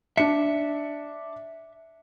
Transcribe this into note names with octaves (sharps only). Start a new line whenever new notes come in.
D4 E5 C#7